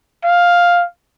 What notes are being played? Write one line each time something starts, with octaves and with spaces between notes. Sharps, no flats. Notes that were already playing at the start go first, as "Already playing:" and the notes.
F5